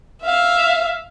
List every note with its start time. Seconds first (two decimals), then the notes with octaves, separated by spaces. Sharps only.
0.23 E5 F5